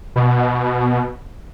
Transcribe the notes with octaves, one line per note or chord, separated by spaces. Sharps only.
B2